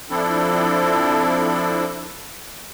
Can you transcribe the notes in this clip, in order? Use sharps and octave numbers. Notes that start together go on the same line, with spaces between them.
F3 C4 D4 E4 A4